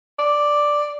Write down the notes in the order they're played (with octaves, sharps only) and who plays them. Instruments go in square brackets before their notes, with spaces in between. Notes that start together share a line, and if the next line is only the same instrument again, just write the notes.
[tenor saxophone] D5